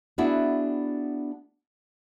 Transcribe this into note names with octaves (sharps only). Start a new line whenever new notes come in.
B3 D4 E4 F#4 G#4